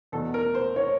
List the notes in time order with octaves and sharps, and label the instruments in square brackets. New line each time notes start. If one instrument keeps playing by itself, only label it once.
[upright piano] E2 B2 A4
A#4
C5
C#5